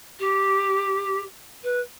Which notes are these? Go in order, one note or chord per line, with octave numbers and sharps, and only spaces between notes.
G4
B4